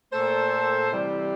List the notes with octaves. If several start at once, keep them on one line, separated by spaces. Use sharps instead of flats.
A#2 A3 A4 C5
C3 E3 G3